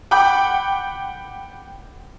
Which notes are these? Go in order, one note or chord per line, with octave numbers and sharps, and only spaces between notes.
F#5 G5 B5 D6 G6